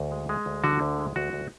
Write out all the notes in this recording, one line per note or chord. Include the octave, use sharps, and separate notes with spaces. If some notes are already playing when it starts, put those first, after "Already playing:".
Already playing: D2
G#3
G#3
D2
D3 F#4
D2
G#3
D2 F#4
D2